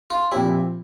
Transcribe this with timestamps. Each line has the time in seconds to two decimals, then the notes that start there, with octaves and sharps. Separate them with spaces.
0.10 F4
0.32 A#2 F3 C4 E4 G4